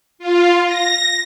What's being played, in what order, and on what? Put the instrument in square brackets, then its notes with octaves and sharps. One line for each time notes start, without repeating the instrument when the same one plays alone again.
[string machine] F4
A#6